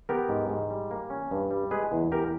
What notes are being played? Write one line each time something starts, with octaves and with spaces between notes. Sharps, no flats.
B3 G4 A#4
G#2
G#2
G3
A#3
C#4
G2
G3
G#3 G#4 B4
E2
E2 G4 A#4